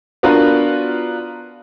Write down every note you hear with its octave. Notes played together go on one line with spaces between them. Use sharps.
B3 D4 F4 F#4 A#4 B4